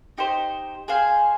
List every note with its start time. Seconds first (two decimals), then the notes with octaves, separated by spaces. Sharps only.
0.18 D#4 G4 C5
0.88 G#4 C5 F5 G#5